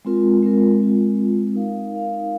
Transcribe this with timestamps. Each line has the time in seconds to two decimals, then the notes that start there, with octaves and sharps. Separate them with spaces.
0.05 G#3 C4 F4 A#4
0.42 G#3 C4 F4 A#4
0.79 G#3 C4 F4
1.17 G#3 C4 F4
1.54 D#4 A#4 F5
1.92 D#4 A#4 F5